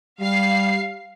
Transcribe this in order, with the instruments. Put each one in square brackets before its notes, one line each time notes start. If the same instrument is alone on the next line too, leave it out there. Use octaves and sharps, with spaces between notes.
[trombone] G3 [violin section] F5 C7